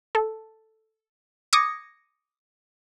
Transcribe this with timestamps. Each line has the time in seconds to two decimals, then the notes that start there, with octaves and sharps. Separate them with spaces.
0.15 A4
1.53 D6 D#6 G#6 A#6 C#7